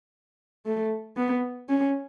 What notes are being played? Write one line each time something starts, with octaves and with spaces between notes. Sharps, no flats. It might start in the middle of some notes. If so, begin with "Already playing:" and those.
A3
B3
C#4